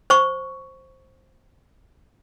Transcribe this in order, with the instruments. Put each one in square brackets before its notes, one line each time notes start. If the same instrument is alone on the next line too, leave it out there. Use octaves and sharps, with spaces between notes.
[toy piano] C5 C#6